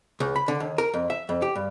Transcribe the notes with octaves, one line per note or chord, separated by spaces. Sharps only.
C#2
B5
D3
D#2
A#4
F2
E5
F2
G4
G2